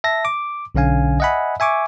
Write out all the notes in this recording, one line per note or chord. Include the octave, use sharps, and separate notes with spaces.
E5 A5 A#6
D6
B1 D3 C#4 F5 G#5
D#5 E5 F#5 G#5 B5
E5 G#5 C#6 D6